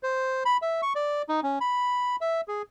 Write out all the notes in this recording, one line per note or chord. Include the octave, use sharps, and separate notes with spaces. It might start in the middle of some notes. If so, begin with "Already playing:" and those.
C5
B5
E5
C#6
D5
D#4
C#4
B5
E5
G#4